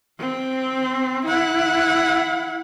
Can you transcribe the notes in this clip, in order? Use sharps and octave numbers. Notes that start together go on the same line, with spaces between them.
C4
E4 F#5